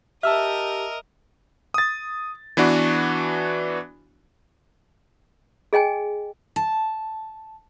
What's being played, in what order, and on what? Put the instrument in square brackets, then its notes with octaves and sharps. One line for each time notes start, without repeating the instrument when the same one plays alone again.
[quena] G4 [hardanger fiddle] A#4 D#5 [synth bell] E5 [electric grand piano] A5 E6 F6
[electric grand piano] D#6 A6
E3 B3 D4 F#4
[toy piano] G#4 D#5 G5 G#5
[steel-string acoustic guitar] A5